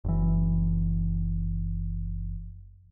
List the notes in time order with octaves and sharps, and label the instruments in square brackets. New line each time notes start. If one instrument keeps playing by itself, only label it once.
[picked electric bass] F#1 E3